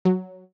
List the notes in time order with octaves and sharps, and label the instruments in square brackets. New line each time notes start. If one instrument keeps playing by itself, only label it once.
[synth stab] F#3